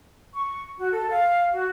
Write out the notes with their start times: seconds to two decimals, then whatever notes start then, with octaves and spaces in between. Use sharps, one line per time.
0.33 C#6
0.78 F#4
0.91 A4
1.10 F5
1.52 F#4